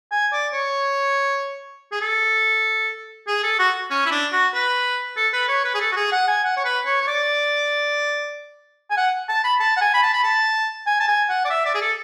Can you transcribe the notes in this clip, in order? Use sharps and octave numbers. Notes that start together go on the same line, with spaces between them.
G#5
D5
C#5
G#4
A4
G#4
A4
F#4
C#4
E4
D4
F#4
B4
A4
B4
C#5
B4
G#4
A4
F#4
G#4
F#5
G#5
F#5
C#5
B4
C#5
C#5
D5
G#5
F#5
A5
B5
A5
F#5
G#5
B5
A5
B5
A5
G#5
A5
G#5
F#5
D5
E5
D5
G#4
A4